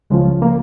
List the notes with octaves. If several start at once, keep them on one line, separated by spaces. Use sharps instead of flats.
C#2 C#3 F3 G#3
A#3